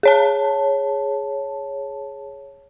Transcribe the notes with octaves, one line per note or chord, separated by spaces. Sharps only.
G#4 C#5 A5